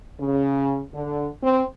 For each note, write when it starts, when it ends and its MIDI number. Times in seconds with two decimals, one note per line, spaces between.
0.20 0.82 49
0.94 1.29 50
1.43 1.63 60